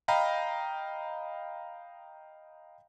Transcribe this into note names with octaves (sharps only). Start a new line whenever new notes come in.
D#5 F5 G5 A#5 B5